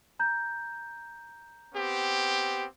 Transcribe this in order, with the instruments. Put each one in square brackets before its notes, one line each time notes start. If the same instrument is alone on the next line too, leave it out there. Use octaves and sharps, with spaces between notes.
[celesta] A#5 G6
[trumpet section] B3 C4 G4